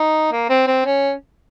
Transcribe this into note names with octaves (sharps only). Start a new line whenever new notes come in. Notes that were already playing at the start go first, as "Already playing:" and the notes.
Already playing: D#4
A#3
C4
C4
C#4